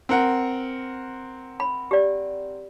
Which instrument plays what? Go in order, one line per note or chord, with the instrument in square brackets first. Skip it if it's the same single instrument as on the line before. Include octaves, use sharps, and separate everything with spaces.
[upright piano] C4 A#4 F#5
[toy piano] B5
G4 D5